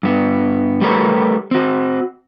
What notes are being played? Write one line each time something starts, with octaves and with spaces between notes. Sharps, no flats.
G2 B3
G3 A3 G4 A#4 B4 C#5
C4 F#4